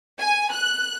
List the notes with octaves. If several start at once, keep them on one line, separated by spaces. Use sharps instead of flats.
G#5
F#6